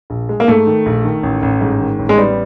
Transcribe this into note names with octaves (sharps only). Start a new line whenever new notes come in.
A#1
G#3
A#3
G#2 A3
D#3
A#1
D#3
A1
A1
G#2
D#3
A1
G#3
G3 B3